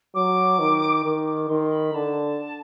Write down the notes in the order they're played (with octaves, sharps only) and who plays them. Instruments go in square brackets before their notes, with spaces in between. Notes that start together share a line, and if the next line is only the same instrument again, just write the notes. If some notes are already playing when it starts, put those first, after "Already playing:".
[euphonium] F#3 [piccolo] D6
[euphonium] D#3
[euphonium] D#3 [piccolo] D6
[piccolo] D6
[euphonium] D#3 [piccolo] C6
[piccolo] B5
[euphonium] D3 [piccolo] A5